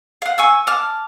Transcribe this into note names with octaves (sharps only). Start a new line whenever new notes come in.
F5 F#5
G#5 C#6 E6
A5 D6 F6